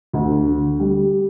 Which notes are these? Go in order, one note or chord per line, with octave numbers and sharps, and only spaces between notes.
D2
D3
G3